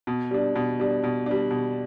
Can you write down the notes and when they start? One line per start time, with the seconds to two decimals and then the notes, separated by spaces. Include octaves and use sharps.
0.07 B2
0.31 G3 D4
0.55 B2
0.80 G3 D4
1.04 B2
1.26 G3 D4
1.51 B2